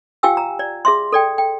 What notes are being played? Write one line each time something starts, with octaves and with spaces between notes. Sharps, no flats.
F4 G4 F5 G5 G#5 E6
A#5
D5
G#4 E5 C6
A4 D5 G5
G5